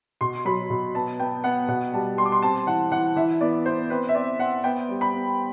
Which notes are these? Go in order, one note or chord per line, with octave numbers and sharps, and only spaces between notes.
B2 C6
F#3 B5
B2
B3 A5
B3 G5
B3 F#5
B2 F#5
G3 A5
G3 C6
D6
C6
C4 A5
E3 F#5
E3 F#5
E3 E5
B3 D5
B3 C5
C4 B4
E5
C4 D5
C4 F#5
B3 G5
G3
B5
B3